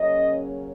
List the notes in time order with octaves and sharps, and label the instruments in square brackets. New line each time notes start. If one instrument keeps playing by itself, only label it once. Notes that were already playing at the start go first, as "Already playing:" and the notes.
Already playing: [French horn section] C#3 F#3 A#3 C#4 D#5